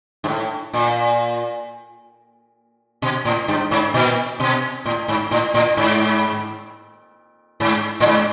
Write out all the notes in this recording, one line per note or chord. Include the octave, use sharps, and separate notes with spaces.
G#2
A2
A#2
B2
A2
G2
G#2
A#2
B2
A2
G#2
A2
A2
G#2
G#2
A2
G#2